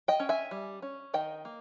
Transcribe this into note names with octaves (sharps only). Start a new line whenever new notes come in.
D#5 G5
C#4
E5 G#5
G3
C#4
D#3 D#5 G5
A#3